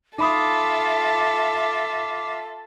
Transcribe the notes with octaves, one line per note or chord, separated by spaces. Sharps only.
D#4 F4 A4 E5 B5 D6 D#6